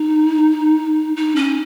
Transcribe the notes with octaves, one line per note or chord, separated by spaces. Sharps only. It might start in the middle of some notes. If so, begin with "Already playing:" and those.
Already playing: D#4
D#4
C#4